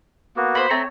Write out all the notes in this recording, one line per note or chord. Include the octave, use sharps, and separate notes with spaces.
A#3 B3 F#4
C5 G5 B5
A3 C4 C#5 A#5